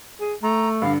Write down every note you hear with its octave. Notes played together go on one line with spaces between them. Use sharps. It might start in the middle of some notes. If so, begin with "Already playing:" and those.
G#4
A3 A#5
G2 D3 F5